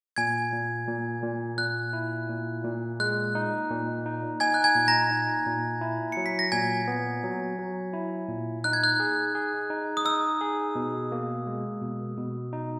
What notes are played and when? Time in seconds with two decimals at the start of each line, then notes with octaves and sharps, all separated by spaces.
0.16 A#2 G#5 G#6
0.53 A#2
0.88 A#2
1.23 A#2
1.58 A#2 F#6
1.93 E4
2.29 A#2
2.64 A#2
3.00 G#3 F#6
3.35 D#4
3.70 A#2
4.06 D#4
4.40 D#4 G#5 G#6
4.54 F#6
4.64 G#5 G#6
4.75 A#2
4.88 A#5 A#6
5.11 D#4
5.46 A#2
5.81 E4
6.12 F#3 C#7
6.26 B6
6.39 A#6
6.52 A#2 G#5 G#6
6.88 B3
7.23 F#3
7.59 F#3
7.94 E4
8.29 A#2
8.64 D#4 F#6
8.73 G#6
8.84 F#6
9.00 G#4
9.35 G#4
9.70 D#4
9.97 D#6
10.05 D#4 E6
10.41 G#4
10.75 B2
11.12 A#3
11.47 G#3
11.82 B2
12.17 B2
12.53 D#4